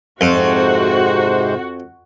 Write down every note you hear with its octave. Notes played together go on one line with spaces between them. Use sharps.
F2 G#2 C3 F#4 C5